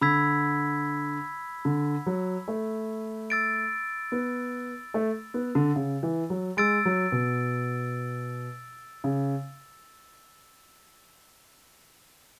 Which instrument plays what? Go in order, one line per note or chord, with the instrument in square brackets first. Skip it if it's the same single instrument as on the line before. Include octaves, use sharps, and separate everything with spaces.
[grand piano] D3 [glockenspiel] B5 E6 G#6 B6
[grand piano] D3
F#3
A3
[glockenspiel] E6 A6 D7
[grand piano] B3
A3
B3
D3
C#3
E3
F#3
[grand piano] G#3 [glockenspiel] E6 A6 D7
[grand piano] F#3
B2
C#3